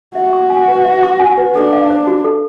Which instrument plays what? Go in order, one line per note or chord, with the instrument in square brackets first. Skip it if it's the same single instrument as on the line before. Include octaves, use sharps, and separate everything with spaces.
[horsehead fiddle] F#4 [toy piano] E5
[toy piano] C#6
G#5
B4
E5
C#6
G#5
B4
[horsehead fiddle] D4 [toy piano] A4
[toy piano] F5
C5
F#4
A4